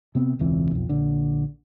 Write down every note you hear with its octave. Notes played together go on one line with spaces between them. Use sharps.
C3 B3 C4
E1 C#2 E3 C4
B1 F2
A#1 D3